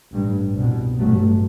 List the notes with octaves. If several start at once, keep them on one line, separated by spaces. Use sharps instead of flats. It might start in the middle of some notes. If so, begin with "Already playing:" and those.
A1 G2
C2 B2
A1 G2 F#3 A3